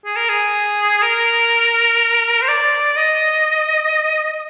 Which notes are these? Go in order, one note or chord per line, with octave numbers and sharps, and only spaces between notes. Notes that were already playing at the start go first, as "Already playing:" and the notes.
G#4
A#4
G#4
A#4
C5
D5
D#5